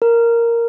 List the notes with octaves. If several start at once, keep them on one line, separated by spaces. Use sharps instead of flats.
A#4